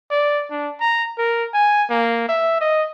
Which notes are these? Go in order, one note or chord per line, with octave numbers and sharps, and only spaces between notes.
D5
D4
A#5
A#4
G#5
A#3
E5
D#5